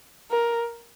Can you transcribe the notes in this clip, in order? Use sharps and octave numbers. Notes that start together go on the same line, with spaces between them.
A#4